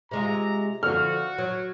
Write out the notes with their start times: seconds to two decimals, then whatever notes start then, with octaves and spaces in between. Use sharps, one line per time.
0.11 C3 G#3 F4 A#5
0.83 D3 F3 F#4 F6
1.38 F#3